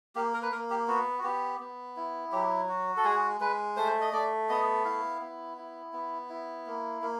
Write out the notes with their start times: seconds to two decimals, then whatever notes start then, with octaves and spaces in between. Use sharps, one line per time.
0.15 A#3 G4
0.34 A#4
0.43 B4
0.51 A#3 A#4
0.70 G4
0.88 B3 F#4
1.18 F#4
1.23 B3 G4
1.60 B3
1.96 E4
2.32 F#3 G4
2.68 F#4
2.97 A4
3.05 G#3 G#4
3.40 G#3 B4
3.77 A3 C5
4.01 D#5
4.13 A3 D5
4.49 B3 D#5
4.85 E4 F5
5.21 B3
5.57 E4
5.93 B3
6.29 E4
6.66 A#3
7.02 A#3